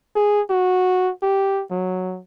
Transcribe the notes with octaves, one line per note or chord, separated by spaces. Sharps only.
G#4
F#4
G4
F#3